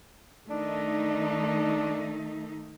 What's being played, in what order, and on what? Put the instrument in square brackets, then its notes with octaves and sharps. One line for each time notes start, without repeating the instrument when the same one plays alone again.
[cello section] D#3 A3 D#4 [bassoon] D4